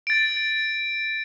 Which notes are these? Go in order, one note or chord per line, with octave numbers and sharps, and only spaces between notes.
A6 D7